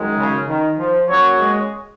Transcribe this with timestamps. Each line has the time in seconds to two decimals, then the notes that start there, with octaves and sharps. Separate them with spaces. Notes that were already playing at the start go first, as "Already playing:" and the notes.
Already playing: F#2 D#3 G#3
0.17 C#3
0.47 D#3
0.78 F3
1.08 F#3 A#3 C#4 F#4 C#5
1.38 G#3